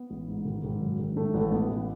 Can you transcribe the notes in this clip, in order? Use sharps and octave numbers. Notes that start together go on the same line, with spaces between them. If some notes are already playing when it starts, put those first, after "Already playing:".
Already playing: B3
A1
G#2
G#1
G#1
F#2
G#1
A2 A3
A1
A3
A2 B3
A1